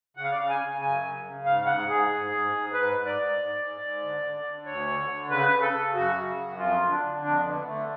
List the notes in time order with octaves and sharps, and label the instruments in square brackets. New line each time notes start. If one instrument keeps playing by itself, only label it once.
[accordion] C#3 F#5
F5
D5
C#3 F5
G#5
C#3
F#2 G#5
C#3
C#3
G#2 F5
G#2 F#5
G#2 G#4
G#2
G#2
G#2
G#2 B4
G#2
D5
G#2
G#2
G#2
G#2
D3
D3
D3
D2 C#5
D3
D3
C#3 B4
C#3
A4
C#3
F#2 F#4
C#3
F#2
F2 F4
D3
D4
D3
F2 D4
D3 B3
D3 A3